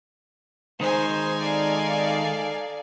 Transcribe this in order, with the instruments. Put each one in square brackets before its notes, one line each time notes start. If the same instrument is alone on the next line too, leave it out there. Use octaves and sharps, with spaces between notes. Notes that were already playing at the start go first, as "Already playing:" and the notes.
[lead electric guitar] D#3 G#3 [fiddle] D#4 G#5 [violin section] C5
[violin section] A4 D5 F5